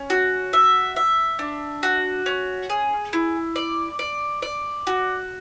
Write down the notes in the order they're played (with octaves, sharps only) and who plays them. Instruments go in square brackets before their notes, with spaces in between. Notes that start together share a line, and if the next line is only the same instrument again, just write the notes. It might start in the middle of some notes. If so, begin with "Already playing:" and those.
Already playing: [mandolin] C#4
F#4
E5
E5
D4
F#4
C#4
G#4
E4
D5
D5
D5
F#4